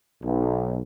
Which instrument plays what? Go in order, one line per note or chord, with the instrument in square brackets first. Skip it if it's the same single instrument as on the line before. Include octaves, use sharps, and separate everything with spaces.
[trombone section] B1